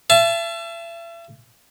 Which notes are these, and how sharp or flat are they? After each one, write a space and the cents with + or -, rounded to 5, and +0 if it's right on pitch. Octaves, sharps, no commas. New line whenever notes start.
E5 +40 A5 -15